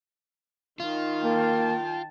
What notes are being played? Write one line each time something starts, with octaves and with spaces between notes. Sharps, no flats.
D#3 F4
A#3 G5 A5